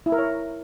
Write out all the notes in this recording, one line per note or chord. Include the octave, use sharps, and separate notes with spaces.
E4
A#4
C#5